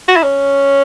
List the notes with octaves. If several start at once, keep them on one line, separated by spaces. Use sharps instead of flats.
F#4
E4
C#4